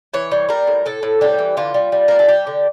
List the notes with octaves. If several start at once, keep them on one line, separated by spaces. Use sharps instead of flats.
E3 C#5
G3
G3 A#4
A2
A2 A4
A2
G3 G4
E3
D3 F4
G3
G3
G3 A#4
A4
G3 G4
D3